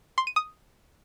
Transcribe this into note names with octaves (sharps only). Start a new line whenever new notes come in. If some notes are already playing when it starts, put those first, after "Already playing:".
C6
D#7
D#6